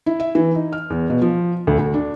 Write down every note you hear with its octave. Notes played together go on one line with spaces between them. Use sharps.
E4
E5
E3
D#4
F6
E2
B2
F3
D2
D2
D4